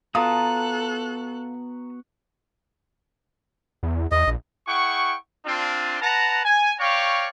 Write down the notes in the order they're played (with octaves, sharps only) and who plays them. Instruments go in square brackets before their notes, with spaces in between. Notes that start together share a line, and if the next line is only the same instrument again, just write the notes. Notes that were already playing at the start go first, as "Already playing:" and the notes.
[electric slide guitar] B3 F#4 [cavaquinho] F4 [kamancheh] A4 F#6 [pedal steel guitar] A5 A#5 D#6
[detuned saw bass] E2
[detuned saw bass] E2 [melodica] D#5
[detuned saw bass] A#1
[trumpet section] E4 G#4 F#5 G5 C#6
C4 D4 F4
B4 F#5 A5 A#5
G#5
C#5 D5 F5 G5 A#5 C#6